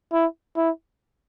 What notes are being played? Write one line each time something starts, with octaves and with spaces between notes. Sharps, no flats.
E4
E4